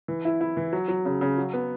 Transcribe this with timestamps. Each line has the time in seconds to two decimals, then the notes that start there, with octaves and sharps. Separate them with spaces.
0.08 E3
0.25 E4
0.41 E4
0.57 E3
0.73 F#3
0.88 F#3
1.05 C#3
1.21 C#3
1.38 F#3
1.53 B3